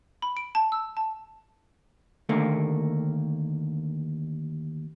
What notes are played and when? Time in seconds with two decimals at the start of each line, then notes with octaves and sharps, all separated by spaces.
0.22 B5
0.37 D7
0.55 A5
0.72 E6
0.97 A5
2.29 D#2 D3 A3 A#3